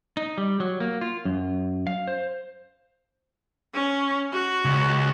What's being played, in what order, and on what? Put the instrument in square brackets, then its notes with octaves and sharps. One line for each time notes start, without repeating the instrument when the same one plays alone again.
[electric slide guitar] D#4
G3
F#3
A#3
F4
F#2
F5
C5
[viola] C#4
F#4
[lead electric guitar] C#2